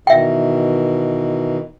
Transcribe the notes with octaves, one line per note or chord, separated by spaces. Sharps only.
B2 D#3 E3 E5 G5